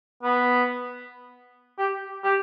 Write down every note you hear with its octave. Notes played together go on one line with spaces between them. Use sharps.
B3
G4
G4